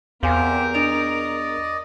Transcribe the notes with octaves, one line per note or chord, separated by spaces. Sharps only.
E2 C4 G4 A#4 C5 F5 G#5
D4 D5 D#5 D7 F7